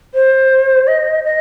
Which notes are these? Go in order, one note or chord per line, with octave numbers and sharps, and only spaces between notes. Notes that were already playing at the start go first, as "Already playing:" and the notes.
C5
D#5
D#5